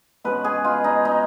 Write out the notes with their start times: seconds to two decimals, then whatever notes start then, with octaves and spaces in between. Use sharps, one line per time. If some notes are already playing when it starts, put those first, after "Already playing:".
0.24 B2 G#3 C#4 B4
0.44 G#4
0.64 F4
0.84 D#4
1.05 D#4